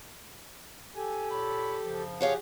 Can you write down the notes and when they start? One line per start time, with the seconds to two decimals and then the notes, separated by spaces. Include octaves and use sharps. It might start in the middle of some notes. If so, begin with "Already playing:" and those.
0.96 G4 A4 G#5
1.31 A#2 C#5 B5
1.85 F#2 C#3 F3
2.21 F4 G4 G#4 C#5 F5 F#5